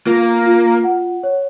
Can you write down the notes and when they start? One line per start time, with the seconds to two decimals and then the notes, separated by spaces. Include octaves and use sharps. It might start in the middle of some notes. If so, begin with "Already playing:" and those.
0.06 A#3 F4
0.46 F4
0.84 F#5
1.23 C#5